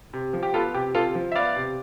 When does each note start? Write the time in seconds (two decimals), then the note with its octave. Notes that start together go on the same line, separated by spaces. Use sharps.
0.13 C3
0.33 F3
0.43 G4
0.54 B3 F4 A4
0.74 C3 G4
0.95 C3 F4 A4
1.15 F3
1.32 E5
1.35 B3 D5 F5
1.56 C3